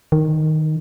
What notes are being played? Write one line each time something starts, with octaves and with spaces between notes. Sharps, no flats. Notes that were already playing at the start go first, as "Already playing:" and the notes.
D#3